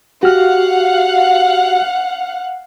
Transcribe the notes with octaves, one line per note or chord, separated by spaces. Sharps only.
F#4 G4 F5 F#5 F6